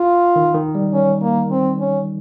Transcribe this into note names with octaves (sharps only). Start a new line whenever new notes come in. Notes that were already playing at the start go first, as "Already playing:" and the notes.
Already playing: F4
D#3
D#3
G3
C#4
A#3
C4
C#4